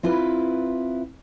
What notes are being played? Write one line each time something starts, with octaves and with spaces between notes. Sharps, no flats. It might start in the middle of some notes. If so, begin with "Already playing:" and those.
C4 E4 F4 B4